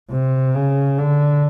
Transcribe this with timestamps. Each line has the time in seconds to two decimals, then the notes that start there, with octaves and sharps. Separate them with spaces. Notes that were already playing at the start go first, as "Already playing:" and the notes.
0.11 C3
0.55 C#3
0.98 D3